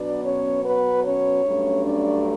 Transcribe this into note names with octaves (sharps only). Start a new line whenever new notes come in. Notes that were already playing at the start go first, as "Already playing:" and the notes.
Already playing: B2 F#3 B3 D4 D5
C#4 C#5
B3 B4
C#4 C#5
G2 F#3 A3 C#4
D4 D5